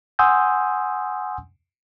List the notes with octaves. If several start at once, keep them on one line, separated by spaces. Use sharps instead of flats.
F#5 G#5 C6 D#6 E6 G6